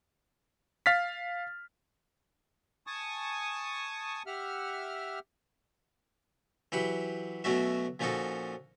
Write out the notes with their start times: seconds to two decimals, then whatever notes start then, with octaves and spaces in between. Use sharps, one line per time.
0.86 F5 F6 A6 B6
2.87 G#5 A5 C#6 D#6
4.27 G4 E5 F#5 F6
6.72 E3 F#3 G4 F#5 B5
7.44 B2 F#3 A3 C#4 F#4 E5
7.99 A#2 F3 C#4 D#4 F#4 A4